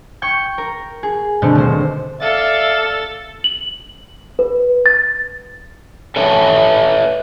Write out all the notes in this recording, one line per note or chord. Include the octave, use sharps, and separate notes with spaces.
G5 C#6 G6 G#6
A#4
G#4
B2 D3 A3 C4
D#1 C5
A4 D5 E5 F5 A6
F#7
B4
A6
A4 B4 C#5 E5 A5